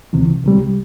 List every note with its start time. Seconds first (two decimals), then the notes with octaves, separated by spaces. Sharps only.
0.13 C#2 C3 E3
0.44 C2 C3 G3